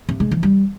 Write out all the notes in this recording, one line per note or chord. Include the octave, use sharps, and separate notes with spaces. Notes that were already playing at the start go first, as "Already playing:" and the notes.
C3
G#3
E3
G3